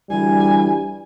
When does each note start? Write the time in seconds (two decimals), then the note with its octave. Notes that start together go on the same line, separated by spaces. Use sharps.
0.10 D2 E3 G3 G#5